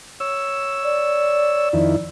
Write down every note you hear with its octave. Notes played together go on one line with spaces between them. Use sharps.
C#5 E6
D5
F2 D#3 E4